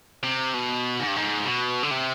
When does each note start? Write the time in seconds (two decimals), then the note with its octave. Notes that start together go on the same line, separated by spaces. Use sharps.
0.23 C3
0.54 B2
1.00 G#2
1.08 G2
1.16 G#2
1.46 B2
1.83 D3
1.91 C3